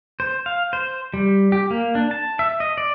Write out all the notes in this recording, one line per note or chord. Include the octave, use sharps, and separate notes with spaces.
C5
F5
C5
G3
G4
A#3
D4
A5
E5
D#5
D5